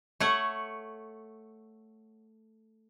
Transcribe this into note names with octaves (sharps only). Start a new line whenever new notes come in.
A3 C#5 F#5